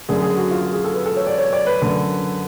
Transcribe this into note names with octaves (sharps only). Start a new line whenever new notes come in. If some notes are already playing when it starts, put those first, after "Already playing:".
F#2 D3 G#4
G#4
F#4
F4
F#4
G#4
A4
B4
A4
C#5
D5
C#5
D5
B4
F#2 D3